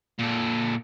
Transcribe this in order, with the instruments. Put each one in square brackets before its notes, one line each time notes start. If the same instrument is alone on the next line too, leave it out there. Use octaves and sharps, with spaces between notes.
[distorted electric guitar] A#2 A4